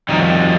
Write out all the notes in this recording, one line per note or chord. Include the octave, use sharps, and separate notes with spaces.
F2 D#3 G3 D#4